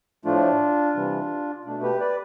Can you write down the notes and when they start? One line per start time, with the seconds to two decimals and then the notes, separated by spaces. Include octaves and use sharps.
0.25 A2 F3 A3 D4 F4
0.95 C3 E3 G3
1.65 B2 A3 D4
1.83 G4 B4
2.00 B4 D5